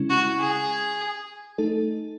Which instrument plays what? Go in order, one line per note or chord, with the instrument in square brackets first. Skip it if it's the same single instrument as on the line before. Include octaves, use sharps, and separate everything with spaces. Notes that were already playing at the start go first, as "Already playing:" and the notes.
Already playing: [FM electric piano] C#3 G#3 C#4 E4
[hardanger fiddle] F#4
G#4
[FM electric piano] A3 D#4 A4